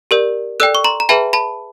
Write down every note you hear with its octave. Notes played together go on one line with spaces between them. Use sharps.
G4 A#4 D5
A4 D5 G5 E6 F#6
C#6
A#5 C6
A#5
G#4 B4 E5 G5 A5 B5
A5 B5